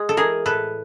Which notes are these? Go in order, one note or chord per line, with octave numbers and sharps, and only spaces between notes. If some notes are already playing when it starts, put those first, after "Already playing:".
Already playing: G#3
A4
E3 G#4 A#4
A2 A4 B4